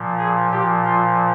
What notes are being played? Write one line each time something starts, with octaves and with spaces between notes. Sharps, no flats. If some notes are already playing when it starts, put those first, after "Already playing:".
Already playing: A#2 F3
G#4
A#2 F3 G4
F4